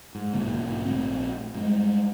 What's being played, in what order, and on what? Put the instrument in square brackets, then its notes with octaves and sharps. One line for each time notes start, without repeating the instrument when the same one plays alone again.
[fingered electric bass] G#2
B1 G#2 D3 A#3
A#1 A3 C4
G2 G#3